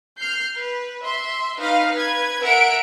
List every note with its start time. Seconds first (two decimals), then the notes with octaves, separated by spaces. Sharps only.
0.18 F6 G6 C7
0.58 B4
1.06 E5 C6
1.59 D#4 B4 F5
1.92 B4 G#6
2.42 A#4 E5 F#5 D7